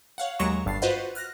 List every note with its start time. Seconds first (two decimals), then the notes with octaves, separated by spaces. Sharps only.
0.18 C#5 F5 F#5
0.39 D#2 F#3 G#3 A#5 C#6 E7
0.65 G1 G2 A6 C7
0.82 F4 F#4 B4 C5 D#5 F#5
1.15 F6 F#6 A#6